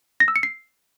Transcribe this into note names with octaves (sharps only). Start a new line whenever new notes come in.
A#6
E6
C#7
C7